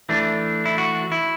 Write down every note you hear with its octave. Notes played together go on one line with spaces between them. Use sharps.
E3 A3 D4
E4
F#4
E4